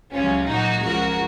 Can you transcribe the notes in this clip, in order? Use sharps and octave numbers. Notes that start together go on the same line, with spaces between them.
C#2 C3 F#3 C#4 F4
A#2 F#3 A#3 D#4 F#4
C#2 C#3 F3 F#4 A#4